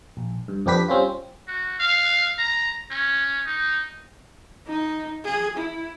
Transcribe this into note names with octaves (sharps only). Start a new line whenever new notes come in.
A#1
G2
F2 C4 D4 G4 B4 B6
G3 C4 C#4 F4
F#4
F5
A#5
C#4
D#4
D#4
G#4
E4